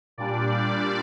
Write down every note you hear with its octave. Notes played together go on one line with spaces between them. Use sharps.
A#2 G3 D4 D5